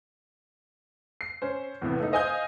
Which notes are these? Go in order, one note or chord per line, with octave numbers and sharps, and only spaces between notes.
C7
C#4 C5
E2 A2 C3 B3
A3 D#4
C5 D#5 F5 G#5 D#6 G6